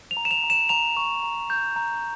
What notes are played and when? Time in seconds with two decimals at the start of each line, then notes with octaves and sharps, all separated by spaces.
0.11 F7
0.17 A#5
0.25 E7
0.31 F7
0.44 A#5
0.50 E7
0.69 A#5 F7
0.97 C#6
1.23 A#5
1.50 G6
1.76 A#5